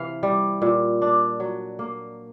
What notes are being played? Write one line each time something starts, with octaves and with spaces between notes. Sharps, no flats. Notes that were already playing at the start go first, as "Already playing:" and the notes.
Already playing: C3 E3 F5
G3
A#2
D4
F#3
A#3